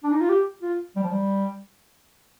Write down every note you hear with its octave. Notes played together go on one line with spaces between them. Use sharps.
D4
D#4
F4
G4
F4
G3
F3
G3